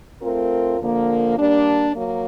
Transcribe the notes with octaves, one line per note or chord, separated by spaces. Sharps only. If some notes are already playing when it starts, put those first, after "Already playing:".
A3 C4 F4 A#4
D3 F3 A#3
G3 A#3 D4
F#3 A#3